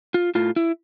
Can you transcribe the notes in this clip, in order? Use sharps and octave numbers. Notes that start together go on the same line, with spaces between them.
F4
A2 F4
E4